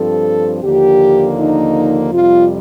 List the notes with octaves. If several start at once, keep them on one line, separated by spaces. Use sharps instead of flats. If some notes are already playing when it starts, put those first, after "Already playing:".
Already playing: G2 F3 C4 A4
D#2 D3 F3 A#3 D4 G4
D#4
F2 C3 G3 F4